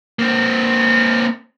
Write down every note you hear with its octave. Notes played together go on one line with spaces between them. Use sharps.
A#3 C4